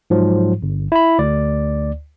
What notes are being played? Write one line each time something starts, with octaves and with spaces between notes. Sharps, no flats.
G#2 F3 F#3
G1
E4 B5
D2 D5